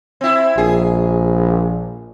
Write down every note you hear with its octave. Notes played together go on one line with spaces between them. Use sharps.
C4 E4
A#1 G#4